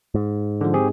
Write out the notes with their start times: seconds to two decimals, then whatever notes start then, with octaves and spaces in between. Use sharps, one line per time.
0.15 G#2
0.61 D3 F3
0.74 C4 G4 G#4